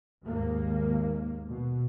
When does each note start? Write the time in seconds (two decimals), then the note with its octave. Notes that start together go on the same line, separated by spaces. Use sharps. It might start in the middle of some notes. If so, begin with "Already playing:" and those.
0.24 D#2 G#2 A#3
1.48 B2